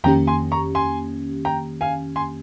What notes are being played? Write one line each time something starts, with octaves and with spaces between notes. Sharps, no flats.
F2 D#3 A#3 C#4 G4 G5 A#5
G#5 C6
A#5 C#6
G#5 C6
G5 A#5
F5 G#5
G#5 C6